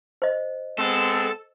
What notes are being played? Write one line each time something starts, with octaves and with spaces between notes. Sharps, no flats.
C5 D#5
G#3 B3 C4 A4